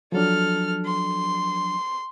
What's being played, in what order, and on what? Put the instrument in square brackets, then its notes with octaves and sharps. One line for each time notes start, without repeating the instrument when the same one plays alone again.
[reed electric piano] F3 F#3 D4 [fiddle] A4 F6
[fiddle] C6